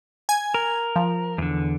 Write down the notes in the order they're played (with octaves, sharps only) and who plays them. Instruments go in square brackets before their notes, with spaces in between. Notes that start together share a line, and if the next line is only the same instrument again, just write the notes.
[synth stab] G#5 G#6
[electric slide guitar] A#4
[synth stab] F3
[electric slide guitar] E2 D3